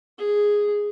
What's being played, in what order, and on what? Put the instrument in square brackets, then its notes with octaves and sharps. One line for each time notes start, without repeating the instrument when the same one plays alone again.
[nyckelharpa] G#4